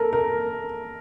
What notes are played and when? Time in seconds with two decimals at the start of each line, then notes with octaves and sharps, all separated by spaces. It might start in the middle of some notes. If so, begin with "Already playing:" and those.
Already playing: A4 A#4
0.13 A#4